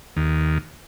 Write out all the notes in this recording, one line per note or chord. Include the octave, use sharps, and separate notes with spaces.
D#2